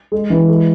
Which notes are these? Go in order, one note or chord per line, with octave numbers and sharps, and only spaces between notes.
G#3
E3
G#3